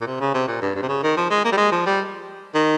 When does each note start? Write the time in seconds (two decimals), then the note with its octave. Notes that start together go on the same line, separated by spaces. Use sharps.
0.01 A#2
0.07 C3
0.21 C#3
0.34 C3
0.48 A#2
0.62 G2
0.76 G2
0.83 C3
0.89 C#3
1.03 D#3
1.17 F3
1.31 G#3
1.45 A#3
1.52 G3
1.58 G#3
1.72 F3
1.86 G3
2.55 D#3